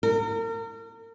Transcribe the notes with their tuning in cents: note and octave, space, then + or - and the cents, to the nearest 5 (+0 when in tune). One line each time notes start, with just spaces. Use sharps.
A#4 -35